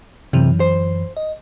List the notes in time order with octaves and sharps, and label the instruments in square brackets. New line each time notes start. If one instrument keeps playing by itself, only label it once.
[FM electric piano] F#2 E3 [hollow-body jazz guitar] C3
[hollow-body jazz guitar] C5
[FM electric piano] D#5